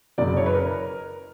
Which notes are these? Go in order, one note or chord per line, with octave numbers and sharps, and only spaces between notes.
F#1 F#2 C#3 D5
C#5
B4
A#4